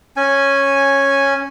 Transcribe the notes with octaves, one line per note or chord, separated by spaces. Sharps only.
C#4 G#5